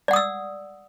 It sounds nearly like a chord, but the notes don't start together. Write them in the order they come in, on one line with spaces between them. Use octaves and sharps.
D5 F#5 D#6 E6